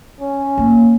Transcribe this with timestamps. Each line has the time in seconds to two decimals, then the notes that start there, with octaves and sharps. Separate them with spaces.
0.20 C#4
0.58 A#3